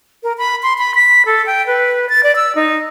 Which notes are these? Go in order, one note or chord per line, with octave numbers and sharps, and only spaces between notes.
A#4
B5
C6
B5
B6
A4
G5
B4
A6
D5
E6
D#4